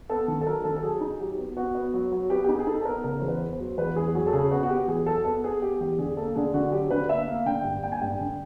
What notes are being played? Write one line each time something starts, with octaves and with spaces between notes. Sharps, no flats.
B3 A4
D#3
A4
F#3 A#4
D#3 A4
A4
F#3 G#4
D#4
F#3 G4
B3
B3 F#4
B3
F#3
F#3
B3 G4
G4
D#4 G#4
G#4
D#4 A4
A4
B3 A#4
C#3 A#4
E2 C5
B4
B3
C5
F#3
E2 B4
E2 G#4
F#3 G#4
A4
C#3 G#4
B3 F#4
F#4
B3 G4
E2 G#4
F#3 A4
B3 A4
B3 G#4
B3 G4
E2 G4
D3 G#4
A#3 A4
D3 G#4
D3 F#4
F#3 G4
D3 B4
A#3 E5
A#3 F5
D3 G5
G2
A#3 G5
G#5
G2 G5
D3